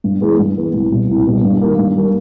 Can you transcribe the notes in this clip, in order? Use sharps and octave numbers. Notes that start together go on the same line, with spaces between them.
G2
E3 G#3 B3
G2
E3 G#3 B3
C2
B2 G3
C2
B2 G3
G2
D#3 G3 A#3
G2
D#3 G3 A#3